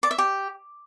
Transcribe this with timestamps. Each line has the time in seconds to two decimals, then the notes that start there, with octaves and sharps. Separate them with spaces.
0.03 D5
0.11 E5
0.18 G4